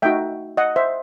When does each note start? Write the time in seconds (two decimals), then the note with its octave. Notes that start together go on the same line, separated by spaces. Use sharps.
0.02 A3 D#4 F#4 E5 G5
0.57 D#5 F#5
0.76 C5 E5